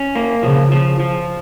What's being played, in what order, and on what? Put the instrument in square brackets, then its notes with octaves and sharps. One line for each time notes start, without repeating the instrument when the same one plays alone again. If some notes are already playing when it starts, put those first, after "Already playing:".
Already playing: [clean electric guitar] C#4
A#3
[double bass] C#3 [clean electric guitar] F3
[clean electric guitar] F3
F3